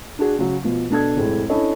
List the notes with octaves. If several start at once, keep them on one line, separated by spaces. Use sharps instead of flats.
D4 F#4 G#4
C#3 F#3
B2 F3
B2 D4 A4 G#6
F1 A2 G#3
C#4 D4 E4 A4 C#5 D#5